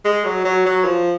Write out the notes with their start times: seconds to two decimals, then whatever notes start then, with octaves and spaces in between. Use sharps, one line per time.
0.05 G#3
0.25 F#3
0.45 F#3
0.66 F#3
0.85 F3